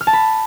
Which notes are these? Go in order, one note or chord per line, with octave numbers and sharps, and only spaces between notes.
F6
A5
B5